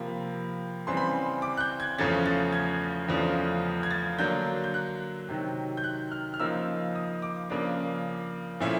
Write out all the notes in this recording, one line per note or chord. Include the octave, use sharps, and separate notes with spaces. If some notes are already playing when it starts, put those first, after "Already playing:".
Already playing: C3 F3 A#3 B5
C#3 E3 G3 C4 C6
B5
C6
D6
F#6
G6
G#6
E2 C#3 F3 A3 C#4 A6
A6
G#6
E2 C#3 F3 A3 D4
G#6
A6
D3 F#3 A#3 D4 G6
G6
F#6
C3 D#3 F#3
G6
F#6
F6
F6
C#3 F3 A#3 D#4 E6
D#6
D6
C#3 F3 A#3 D4 D6
A#2 F3 A3 C#4 E4